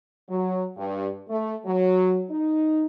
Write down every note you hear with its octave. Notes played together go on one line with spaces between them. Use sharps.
F#3
G2
A3
F#3
D#4